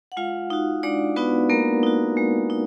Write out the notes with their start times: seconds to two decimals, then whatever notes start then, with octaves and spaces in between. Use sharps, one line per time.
0.12 F#5
0.17 G#3 F4 F5
0.50 D#4 F#4
0.83 G#3 D4 D5
1.16 B3 D#4 F#4 B4
1.50 G#3 A#3 A#4
1.83 D#4 F#4
2.17 G#3
2.50 D#4